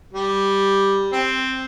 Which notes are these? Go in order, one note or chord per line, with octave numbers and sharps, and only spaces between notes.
G3
C4